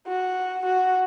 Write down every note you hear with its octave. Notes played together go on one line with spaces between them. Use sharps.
F#4
F#4